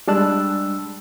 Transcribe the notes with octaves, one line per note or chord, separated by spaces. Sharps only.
G3 G#3 D4 A5 E6 F#6